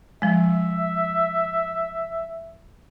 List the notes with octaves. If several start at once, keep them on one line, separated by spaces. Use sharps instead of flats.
F3 G#3 E5